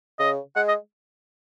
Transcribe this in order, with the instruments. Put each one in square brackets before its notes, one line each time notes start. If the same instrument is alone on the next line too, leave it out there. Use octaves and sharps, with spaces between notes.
[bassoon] C#3 [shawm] D#5
[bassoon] G#3 [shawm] F#5
[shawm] D#5